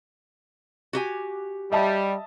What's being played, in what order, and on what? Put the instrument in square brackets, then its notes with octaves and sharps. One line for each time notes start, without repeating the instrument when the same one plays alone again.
[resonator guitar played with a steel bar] F#4 G4 G#5
[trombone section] G3 [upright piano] D#5 E5 A5